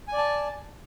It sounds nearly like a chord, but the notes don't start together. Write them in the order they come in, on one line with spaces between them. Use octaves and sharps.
G#5 D5 A5